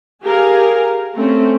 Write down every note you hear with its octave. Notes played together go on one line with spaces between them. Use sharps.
G4 G#4 A#4 F5 G#5
A3 C4 C#4